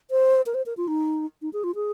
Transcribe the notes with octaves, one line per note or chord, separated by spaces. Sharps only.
C5
A#4
C5
A#4
F4
D#4
D#4
G#4
F4
G#4